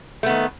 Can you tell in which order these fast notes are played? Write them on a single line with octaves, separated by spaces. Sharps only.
A3 B3 D#3